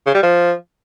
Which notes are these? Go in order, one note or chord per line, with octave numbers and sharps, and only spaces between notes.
C#3
G3
F3